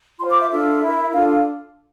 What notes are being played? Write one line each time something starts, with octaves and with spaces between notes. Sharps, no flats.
F4 C6
C5
D6
E5
D4 F4 A4 E5
E4 A#4
D4 F4 A4 F5
F5